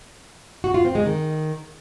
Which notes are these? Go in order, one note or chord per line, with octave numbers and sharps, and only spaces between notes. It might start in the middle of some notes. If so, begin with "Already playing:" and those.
F#4
F4
C4
G#3
D#3